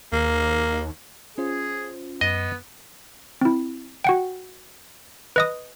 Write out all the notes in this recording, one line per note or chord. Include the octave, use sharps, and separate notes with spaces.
D#2 A#3
C#4 F4 G#4 C5
F#2 B3 D#5
C4 E4
F#4 F#5 G5
B4 D#5 D#6